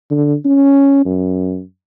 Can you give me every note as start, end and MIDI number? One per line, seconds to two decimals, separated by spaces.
0.11 0.35 50
0.45 1.04 61
1.05 1.62 42